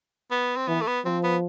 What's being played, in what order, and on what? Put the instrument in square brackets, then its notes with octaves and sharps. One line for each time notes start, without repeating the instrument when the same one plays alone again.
[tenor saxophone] B3
C4
[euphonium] E3 [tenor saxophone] B3
[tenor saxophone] A3
B3
[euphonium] F3 [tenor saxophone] C4
[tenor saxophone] B3